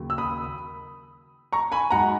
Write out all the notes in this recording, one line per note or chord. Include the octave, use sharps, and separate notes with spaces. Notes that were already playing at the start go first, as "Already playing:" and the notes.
Already playing: D#2 C#3 F#3
E6
B5 D#6
A#5 C#6
G#5 B5
G#2 F#3 F#5 A#5